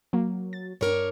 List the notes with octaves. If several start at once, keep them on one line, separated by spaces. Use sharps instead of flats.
F#3 A#3
A6
G2 D4 A#4 C#5